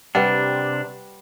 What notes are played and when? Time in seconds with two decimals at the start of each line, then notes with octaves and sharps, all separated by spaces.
0.15 C3 G3 D4 B4 F#5 G5